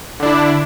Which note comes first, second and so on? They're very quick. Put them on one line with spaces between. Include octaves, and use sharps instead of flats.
D3 D4 E4